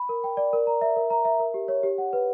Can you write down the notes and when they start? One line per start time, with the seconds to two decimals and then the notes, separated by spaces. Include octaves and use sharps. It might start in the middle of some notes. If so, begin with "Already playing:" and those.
Already playing: B5
0.09 A#4
0.24 G5
0.37 D5
0.53 A#4
0.67 A#5
0.81 E5
0.96 A#4
1.10 A#5
1.25 E5
1.39 A#4
1.54 G4
1.68 C#5
1.83 G4
1.98 F#5
2.13 B4